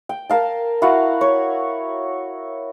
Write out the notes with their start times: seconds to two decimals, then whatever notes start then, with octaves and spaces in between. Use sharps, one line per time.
0.09 G5
0.30 A#4 F5 A5
0.82 E4 F#4 F5 F#5
1.21 C#5